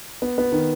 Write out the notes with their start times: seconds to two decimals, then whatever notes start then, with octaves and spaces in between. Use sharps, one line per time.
0.22 B3
0.38 B3
0.52 D#3